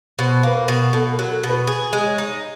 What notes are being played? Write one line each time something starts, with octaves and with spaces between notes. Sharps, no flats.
B2 C5
A#3 B4
A#4
B2
B2 A4
A#4
F#3
A4
B2
B4
G#4
G#3
C#5
D#4